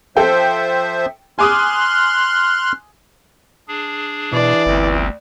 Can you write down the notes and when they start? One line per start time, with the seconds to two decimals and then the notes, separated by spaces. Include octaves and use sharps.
0.17 F3 A4 C5 E5 G5
1.39 G#5 C6 D6 D#6 F6 F#6
3.68 D4 G#4
4.33 B2 E3 D5
4.66 G1 D2 C4